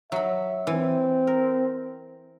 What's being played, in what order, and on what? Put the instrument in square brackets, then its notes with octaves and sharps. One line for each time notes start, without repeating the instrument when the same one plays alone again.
[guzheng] F#3 B5 [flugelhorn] E5
[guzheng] E3 [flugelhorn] C4
[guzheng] A#4